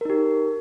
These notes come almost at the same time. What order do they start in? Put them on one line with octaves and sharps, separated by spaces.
A#4 D#4 G4